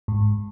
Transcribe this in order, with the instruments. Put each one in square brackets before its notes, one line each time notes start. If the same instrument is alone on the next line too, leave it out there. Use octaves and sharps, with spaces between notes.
[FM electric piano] G#2